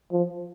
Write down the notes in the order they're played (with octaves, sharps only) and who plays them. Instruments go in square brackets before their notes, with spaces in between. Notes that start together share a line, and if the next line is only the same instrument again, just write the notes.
[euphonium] F3